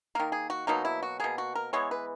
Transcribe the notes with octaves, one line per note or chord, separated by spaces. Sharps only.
D#3 A#3 A#4
G#4
F#4
B2 F#3 A#3 D#4
E4
F#4
B2 A#3 G#4
F#4
A#4
E3 G#3 B3 C#5
B4